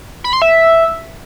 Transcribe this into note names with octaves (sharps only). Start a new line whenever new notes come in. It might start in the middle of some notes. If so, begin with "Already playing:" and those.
B5
C6
E5